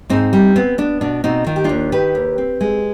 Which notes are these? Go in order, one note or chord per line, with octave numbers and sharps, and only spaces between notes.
G#2 C4 D#4
G3
B3 C4
B3 D4
B2 D4
B2 C4 D#4
D#3 F4
G4
D#2 D4 F4
D#3 G4 B4
D#2
C4
G#3